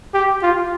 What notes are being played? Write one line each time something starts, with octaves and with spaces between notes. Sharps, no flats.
G4
F4